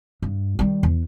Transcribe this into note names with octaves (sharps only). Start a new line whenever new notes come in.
G2
D#3 G3
E2